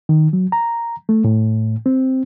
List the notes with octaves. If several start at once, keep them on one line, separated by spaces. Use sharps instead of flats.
D#3
F#3
A#5
A3
A2
C4